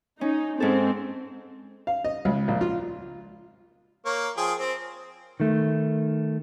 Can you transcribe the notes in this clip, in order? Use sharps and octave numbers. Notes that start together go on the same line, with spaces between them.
C#4 D#4
G#2 C4 C#4 A4
F5
D#5
C#2
A#1
F4
A#3 C#5
F3 G#4 G5
C4
D#3 A3